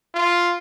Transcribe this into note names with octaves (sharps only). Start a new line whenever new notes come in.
F4